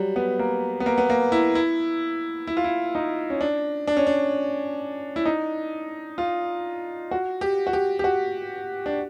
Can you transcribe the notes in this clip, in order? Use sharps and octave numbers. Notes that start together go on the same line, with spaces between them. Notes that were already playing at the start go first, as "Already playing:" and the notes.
Already playing: F#3 G3
B3
A#3
B3
A#3
B3
A#3
E4
E4
E4
F4
E4
D#4
C#4
D4
D4
C#4
D4
E4
D#4
F4
F#4
G4
F#4
G4
G4
F#4
D4